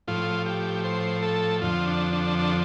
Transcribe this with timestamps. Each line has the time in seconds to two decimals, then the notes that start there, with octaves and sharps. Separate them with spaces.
0.08 A2 F3 F4
0.46 G4
0.84 C5
1.22 A4
1.61 F2 D3 F3 F4
1.87 D4
2.13 D4
2.39 D4